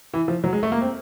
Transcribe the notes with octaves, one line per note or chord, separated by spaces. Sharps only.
E3
F3
F#3
G#3
A3
A#3
C4